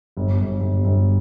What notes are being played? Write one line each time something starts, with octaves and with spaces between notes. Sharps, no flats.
G1
G1
G1
G1